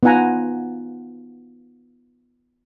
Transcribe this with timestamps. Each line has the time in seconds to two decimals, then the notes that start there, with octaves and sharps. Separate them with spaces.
0.03 B3 D#4 F4 F#5 G#5 A#5